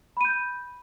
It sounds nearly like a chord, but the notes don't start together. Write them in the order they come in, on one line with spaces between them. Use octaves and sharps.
B5 D#7 G6